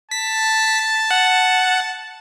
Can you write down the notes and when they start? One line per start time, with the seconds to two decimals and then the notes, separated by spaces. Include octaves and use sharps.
0.11 A5 B6
1.11 F#5